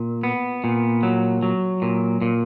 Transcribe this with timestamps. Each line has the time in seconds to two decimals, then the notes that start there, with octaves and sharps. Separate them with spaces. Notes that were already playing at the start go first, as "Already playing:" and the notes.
Already playing: A#2
0.23 B3
0.64 A#2
1.03 F#3
1.43 F#3
1.82 A#2
2.22 A#2